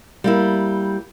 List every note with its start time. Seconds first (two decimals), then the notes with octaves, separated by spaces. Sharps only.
0.24 G3 A#3 E4